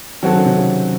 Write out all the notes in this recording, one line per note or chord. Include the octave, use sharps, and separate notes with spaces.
D#3 F#3 C4 F#4 A4
C#3
C3
C#3